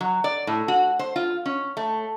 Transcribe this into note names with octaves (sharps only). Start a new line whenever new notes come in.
F#3
D5
A2
F#4
C5
F4
C#4
A3